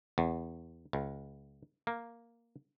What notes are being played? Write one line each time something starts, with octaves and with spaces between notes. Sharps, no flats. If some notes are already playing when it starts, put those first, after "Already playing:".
E2
C#2
A#3